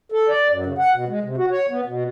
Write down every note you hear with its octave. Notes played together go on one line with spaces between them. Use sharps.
A4
D5
F#2
C#3
F#5
B2
G#3
C3
F#4
C#5
B3
B2